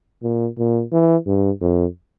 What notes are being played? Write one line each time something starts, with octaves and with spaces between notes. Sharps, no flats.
A#2
A#2
E3
G2
F2